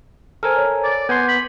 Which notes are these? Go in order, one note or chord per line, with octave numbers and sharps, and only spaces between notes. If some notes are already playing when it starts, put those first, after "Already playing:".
A4 A#4 C5 G#5 F6
C#5
D5
B3 F#5 G#5 C6 G6
B5